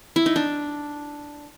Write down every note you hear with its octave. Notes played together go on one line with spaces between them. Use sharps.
E4
D#4
D4